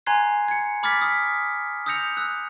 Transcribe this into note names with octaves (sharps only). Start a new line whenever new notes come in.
G#5 A#5 C6 F#6 G#6 C7
G#6 C#7
B5 D6 F6 G#6 A6 B6
D#6 B6
D#6 E6 G6 A#6 C#7 F7
E6 F#6